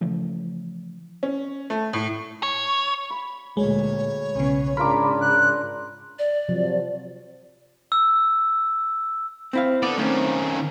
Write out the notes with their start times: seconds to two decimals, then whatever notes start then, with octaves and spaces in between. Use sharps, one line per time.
0.01 C#3 E3 F3 A3
1.23 C#4
1.70 A3
1.93 A2
2.43 C#5
3.10 B5
3.57 D2 A#2 G#3 C#5
4.36 B1 C#3 B3 C#4
4.77 G#2 C#3 D4 F4 A#4 B5 D6
5.21 F#6
6.19 D5
6.49 C3 F3 F#3
7.92 E6
9.53 C4 E4 F5
9.82 B3 A4 D5
9.98 D#3 A3 C4 C#4